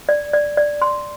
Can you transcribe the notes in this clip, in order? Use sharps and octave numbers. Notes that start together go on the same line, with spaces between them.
D5
D5
D5
C6